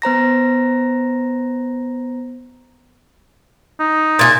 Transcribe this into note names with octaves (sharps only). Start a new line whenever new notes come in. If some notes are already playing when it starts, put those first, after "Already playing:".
B3 C5 A#5 A#6
D#4
A#2 F#4 G#4